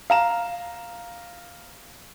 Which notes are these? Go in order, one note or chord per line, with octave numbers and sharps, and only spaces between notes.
F5 A#5 E7